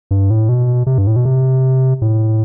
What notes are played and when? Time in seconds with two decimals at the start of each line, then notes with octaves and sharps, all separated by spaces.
0.11 G2
0.30 A2
0.49 B2
0.87 C3
0.98 G2
1.07 A2
1.16 B2
1.25 C3
2.02 A2